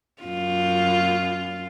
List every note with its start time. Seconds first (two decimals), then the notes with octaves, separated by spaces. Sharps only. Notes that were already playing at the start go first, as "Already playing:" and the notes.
0.23 F#2 F4